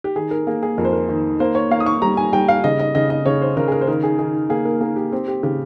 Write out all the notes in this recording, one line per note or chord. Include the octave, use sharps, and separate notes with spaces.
G4
D#3 G#4
A#4
A#3 G#4
G#4
F2 A#4
C5
A#4
D#3
A#3 C5
C#5
A#3 F5
D#6
C#6
G3 A#5
G#5
G3 G5
F5
C#3 D#5
D#5
C#3 D#5
D#5
C#3 C#5
C5
C#3 A#4
G#4
A#4
C5
D#3 A#4
G#4
D#3 G#4
A#3 G#4
A#4
A#3 G#4
G4
C4 G4
G4
C#3 G4